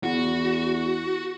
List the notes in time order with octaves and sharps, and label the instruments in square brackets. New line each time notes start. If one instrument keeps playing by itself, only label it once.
[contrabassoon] E2 [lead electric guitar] F#4